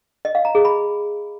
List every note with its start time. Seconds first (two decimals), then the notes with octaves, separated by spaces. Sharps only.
0.25 D#5
0.35 F5
0.45 A#5
0.55 G#4
0.65 B5